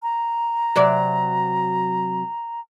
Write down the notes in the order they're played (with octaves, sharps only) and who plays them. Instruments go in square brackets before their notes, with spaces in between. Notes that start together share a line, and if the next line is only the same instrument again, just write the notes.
[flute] A#5
[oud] C3 F#3 D5